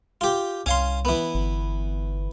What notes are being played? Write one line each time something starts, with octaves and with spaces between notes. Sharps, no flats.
F4 G4
C2 C#4 F5 C6
E3 B3
G1